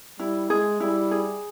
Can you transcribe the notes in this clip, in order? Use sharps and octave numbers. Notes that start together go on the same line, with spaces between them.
G3 E4
G#3 G#4
G3 E4
G#4